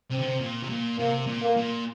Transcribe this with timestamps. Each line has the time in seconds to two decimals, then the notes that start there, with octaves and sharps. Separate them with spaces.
0.11 C3 C4
0.19 D3
0.27 C3
0.41 A#2
0.63 C3
0.69 A#2
0.99 C3 A#3
1.27 A#2
1.42 A#3
1.57 A#2